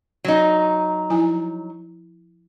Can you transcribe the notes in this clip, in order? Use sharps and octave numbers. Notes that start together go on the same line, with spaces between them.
F#3 D#4
F3 E4 G#5